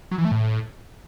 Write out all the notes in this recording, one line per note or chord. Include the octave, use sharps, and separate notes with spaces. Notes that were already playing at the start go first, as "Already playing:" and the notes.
F#3
E3
A3
A2